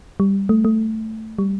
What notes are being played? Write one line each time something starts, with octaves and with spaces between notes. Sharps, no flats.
G3
A3
A3
G3